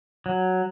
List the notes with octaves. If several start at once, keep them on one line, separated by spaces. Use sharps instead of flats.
F#3